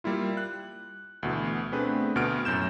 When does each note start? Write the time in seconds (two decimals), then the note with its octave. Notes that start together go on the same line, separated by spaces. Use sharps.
0.04 G3 A#3 E4 F4
0.37 F#6
1.23 D2 B2 E3
1.72 A3 B3 C4 D4 G#4 B4
2.16 D2 B2 B3 F6 D7
2.45 F#2 A2 G6 E7